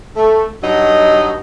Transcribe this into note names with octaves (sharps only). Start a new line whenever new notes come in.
A3
G2 F#3 D#4 F#4 D#5